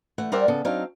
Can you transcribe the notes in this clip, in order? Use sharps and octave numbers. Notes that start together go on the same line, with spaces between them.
E3 A3 F#5
G3 A#4 C5 D5 E5 F#5
C#3 B3 A4
F#3 C4 D4 D#4 F5